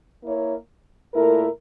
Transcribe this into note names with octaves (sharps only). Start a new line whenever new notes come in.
A#3 E4 A#4 C#5
A#2 A3 E4 A#4